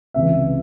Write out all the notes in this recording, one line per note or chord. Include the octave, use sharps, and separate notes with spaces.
C#2 C3 E3 E5